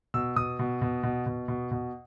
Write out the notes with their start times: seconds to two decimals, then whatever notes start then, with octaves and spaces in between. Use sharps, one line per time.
0.14 B2 E6
0.36 B2 D#6
0.59 B2
0.82 B2
1.03 B2
1.27 B2
1.48 B2
1.71 B2